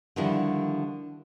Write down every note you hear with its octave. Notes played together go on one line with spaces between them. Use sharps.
D3 D#3 F3 G3 E4 F#4